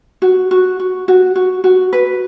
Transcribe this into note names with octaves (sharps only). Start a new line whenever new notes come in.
F#4
F#4
F#4
F#4
F#4
F#4
B4